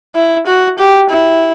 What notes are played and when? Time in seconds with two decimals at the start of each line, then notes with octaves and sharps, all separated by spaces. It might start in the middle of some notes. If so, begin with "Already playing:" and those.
0.15 E4
0.46 F#4
0.78 G4
1.09 E4